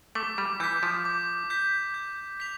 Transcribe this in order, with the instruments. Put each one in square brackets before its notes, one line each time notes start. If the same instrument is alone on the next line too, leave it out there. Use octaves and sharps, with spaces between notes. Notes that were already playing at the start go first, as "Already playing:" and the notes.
[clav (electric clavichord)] A3 [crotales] D6
[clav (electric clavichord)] G3
[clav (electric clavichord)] E3 [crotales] G6 B6
[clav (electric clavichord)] F3
[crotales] D6
G6 B6
G6
B6 F7